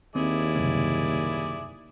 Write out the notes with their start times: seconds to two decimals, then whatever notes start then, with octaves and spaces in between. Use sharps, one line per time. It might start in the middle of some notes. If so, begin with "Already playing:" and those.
0.16 D#2 C4 E4 G#4 D5
0.56 F#1 C2 C3